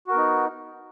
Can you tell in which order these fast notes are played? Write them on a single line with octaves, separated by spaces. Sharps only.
F#4 A#4 B3 D#4